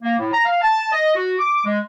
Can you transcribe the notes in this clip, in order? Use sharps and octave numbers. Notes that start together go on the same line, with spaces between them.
A#3
A2
A#5
F5
A5
D#5
F#4
D6
G#3